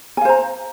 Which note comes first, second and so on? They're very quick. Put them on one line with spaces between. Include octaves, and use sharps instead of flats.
G#5 F5 C5 A#5